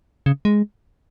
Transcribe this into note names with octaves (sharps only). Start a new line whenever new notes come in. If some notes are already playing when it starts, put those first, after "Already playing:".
C#3
G#3